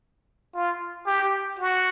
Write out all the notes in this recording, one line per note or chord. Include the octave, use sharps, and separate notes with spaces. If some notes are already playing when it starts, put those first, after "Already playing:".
F4
G4
F#4